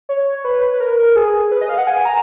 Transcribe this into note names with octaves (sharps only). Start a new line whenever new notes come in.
C#5
B4
B4
A#4
G#4
B4
D#5
F5
F#5
G#5
A#5